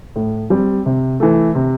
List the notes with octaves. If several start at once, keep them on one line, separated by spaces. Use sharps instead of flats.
A2
G3 C4
C3
E3 A3
C3